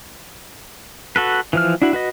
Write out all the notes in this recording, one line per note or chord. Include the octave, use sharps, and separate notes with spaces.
F#4 A4 B4
E3 F3 F6
D4 E4 F#4
F#4 B4 D#5